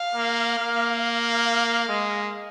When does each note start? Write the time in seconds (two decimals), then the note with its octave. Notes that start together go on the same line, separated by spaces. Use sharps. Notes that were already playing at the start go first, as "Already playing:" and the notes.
Already playing: F5
0.15 A#3
0.58 A#3
1.02 F5
1.88 G#3